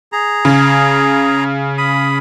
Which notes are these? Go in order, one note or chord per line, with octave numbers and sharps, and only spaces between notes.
G#4 A#5
C#3
B5 D#6